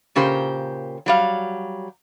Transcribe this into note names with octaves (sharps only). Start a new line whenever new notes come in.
A#2 C#3 G4 A#4 C5
F#3 G3 F5